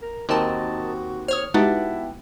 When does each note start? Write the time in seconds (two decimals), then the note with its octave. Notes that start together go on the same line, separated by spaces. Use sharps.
0.02 A#4
0.29 D#2 C4 F#4 A#4 D#5 A5
1.28 C5 C#5 D#6 F6
1.54 G#3 B3 D#4 E4 F#4 G4 F#5 A5